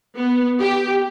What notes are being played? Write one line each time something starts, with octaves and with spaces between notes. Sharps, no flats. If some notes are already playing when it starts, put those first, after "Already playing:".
B3
G4